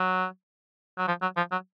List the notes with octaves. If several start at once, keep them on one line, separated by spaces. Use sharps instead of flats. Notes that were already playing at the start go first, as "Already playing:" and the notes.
Already playing: F#3
F#3
F3
F#3
F3
F#3